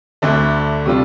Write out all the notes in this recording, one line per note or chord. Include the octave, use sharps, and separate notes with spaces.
D2 D3 A3 D4
C3 G3 D4 F4